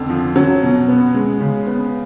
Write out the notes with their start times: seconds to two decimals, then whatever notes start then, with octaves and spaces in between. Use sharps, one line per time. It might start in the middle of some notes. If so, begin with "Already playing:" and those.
Already playing: F2 D3
0.09 F3
0.36 F#3
0.62 B2
0.88 B3
1.15 G#3
1.40 C#3
1.67 B3